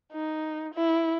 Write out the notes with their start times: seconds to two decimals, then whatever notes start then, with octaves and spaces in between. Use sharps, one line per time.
0.13 D#4
0.74 E4